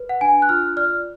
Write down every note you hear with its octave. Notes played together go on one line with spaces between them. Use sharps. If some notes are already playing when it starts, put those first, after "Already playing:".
Already playing: B4
F#5
D4 G#5
F#6
F4 F6
D5 F6